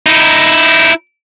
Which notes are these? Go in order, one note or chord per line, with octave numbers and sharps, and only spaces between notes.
D#4 E4